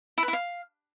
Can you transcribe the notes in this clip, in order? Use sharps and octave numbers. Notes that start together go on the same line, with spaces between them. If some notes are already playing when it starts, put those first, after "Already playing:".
E4
B4
E4
F5